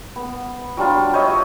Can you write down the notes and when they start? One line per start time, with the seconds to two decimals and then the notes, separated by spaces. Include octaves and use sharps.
0.16 B3
0.77 F#3 G3 D4 F4
1.13 C5 C#5 D#5 E5